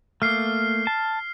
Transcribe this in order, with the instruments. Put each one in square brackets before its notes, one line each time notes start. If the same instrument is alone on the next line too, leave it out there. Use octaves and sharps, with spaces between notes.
[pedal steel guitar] A3 A#3 [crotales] F6 C7
[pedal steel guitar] A5